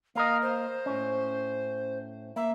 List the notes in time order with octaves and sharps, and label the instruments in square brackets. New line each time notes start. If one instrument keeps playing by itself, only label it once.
[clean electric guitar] A#3 A#4 D#5 [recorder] F5
[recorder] C5
[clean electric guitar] A2 C#4
[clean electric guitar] A#3 [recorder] E5